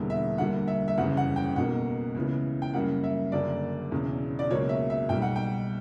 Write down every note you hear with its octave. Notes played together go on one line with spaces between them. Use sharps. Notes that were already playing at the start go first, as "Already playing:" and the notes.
Already playing: E1 E2 D3 G3 A#3
E5
D2 D3 G3 A#3 F#5
E5
E5
F#1 E2 C#3 G3 B3 F#5
F#5
G5
B1 B2 A#3 F#5
C#2 C#3 E3 B3
G5
F#2 C#3 G3 A#3 F#5
E5
F#1 F#2 D3 A#3 D5
E1 E2 C#3
D5
C#2 B2 F#3 A#3 C#5
E5
E5
B1 B2 G3 G5
F#5
G5